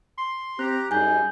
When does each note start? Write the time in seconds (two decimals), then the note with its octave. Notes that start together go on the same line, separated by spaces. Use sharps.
0.18 C6
0.59 C4 G4 A#5 F#6
0.91 F#2 G3 D#4 G#4 G#5 G6